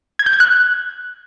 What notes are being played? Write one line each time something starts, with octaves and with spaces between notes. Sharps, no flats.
G#6
G6
G#6
F#6